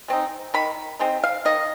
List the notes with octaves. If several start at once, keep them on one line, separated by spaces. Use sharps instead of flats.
G#3 C4 D#4
D#3 B5
G#3 C4 D#4
F5
D#3 D#5